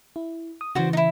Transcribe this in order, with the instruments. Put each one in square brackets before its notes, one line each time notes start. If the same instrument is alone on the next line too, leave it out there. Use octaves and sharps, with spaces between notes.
[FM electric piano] E4
D#6
[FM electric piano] C#3 E3 [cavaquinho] F#4 C5 D5
[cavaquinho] D#4 E4